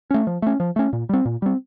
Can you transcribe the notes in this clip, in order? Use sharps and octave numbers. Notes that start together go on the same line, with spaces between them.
A3 C#4
F3
A3 C#4
F3
A3 C#4
A#2
G3 C4
A#2
G3 C4